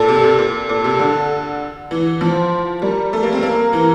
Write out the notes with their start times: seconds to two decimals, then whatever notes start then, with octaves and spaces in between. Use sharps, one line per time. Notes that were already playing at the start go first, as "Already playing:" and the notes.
Already playing: A#2 A4
0.08 C3
0.23 C3
0.39 A#2
0.69 A#2 A4
0.84 C3
0.99 D3
1.91 E3
2.21 F3 C5
2.82 G3 A#4
3.13 A3
3.23 A#3
3.33 C4
3.43 A#3 A#4
3.73 E3